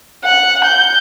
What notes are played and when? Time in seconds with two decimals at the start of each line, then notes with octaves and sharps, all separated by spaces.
0.24 F#5
0.64 G6